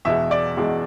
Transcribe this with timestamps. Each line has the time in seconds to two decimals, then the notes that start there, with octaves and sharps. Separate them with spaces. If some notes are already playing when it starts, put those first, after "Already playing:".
0.05 E2 B2 G#3 E5
0.31 D5
0.57 E2 B2 G#3